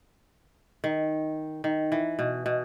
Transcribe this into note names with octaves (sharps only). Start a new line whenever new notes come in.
D#3
D#3
E3
B2
B2